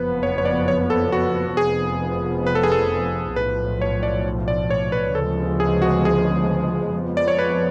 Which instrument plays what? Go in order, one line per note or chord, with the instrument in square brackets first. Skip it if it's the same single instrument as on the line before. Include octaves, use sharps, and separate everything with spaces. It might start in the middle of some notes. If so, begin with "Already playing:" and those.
Already playing: [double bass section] F#1 F2 F3 B3 [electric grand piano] B4
[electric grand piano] C#5
C#5
D5
C#5
A4
F#4
[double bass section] F1 F2 F3 B3 [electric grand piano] G#4
[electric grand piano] B4
A4
G#4
A4
[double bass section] B1 A2 F3 [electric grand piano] B4
[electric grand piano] C#5
D5
D5
C#5
B4
[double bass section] D2 C#3 F3 G#3 B3 [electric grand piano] A4
[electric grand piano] G#4
F#4
G#4
[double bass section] F2 F3 G#3 B3
[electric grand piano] D5
C#5
B4